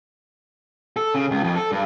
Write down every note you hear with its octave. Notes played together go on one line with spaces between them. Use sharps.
A4
C#3
C#2
F2
A4
G2